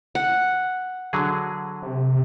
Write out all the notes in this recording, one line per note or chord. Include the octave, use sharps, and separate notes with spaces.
F#5
D3 F#3 G#4
C3